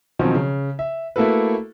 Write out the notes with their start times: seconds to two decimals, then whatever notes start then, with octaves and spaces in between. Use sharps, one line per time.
0.19 B2 D#3 F3 F#3 C4 C#4
0.35 C#3
0.79 E5
1.16 A3 A#3 E4 F#4 A4 B4